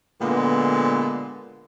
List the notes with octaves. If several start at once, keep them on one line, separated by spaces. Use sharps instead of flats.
A#2 D3 G#3 B3